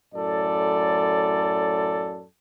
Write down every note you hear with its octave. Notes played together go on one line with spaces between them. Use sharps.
F#2 A2 A4 D5